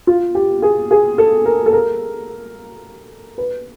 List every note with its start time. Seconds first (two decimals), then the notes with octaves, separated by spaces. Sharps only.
0.07 F4
0.35 G4
0.62 G#4
0.91 G#4
1.18 A4
1.46 A#4
1.66 A4
1.73 A#4
3.38 B4